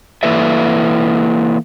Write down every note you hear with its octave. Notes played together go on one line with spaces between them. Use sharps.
E3 A#3 E4 A4 B4 E5